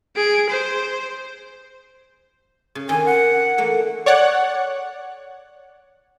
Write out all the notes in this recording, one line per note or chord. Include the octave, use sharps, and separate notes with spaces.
G#4 D7
C5
C#3
D#3 C4 D4 G#5
F#5
E3 A3 A#3
C#5 D5 F#5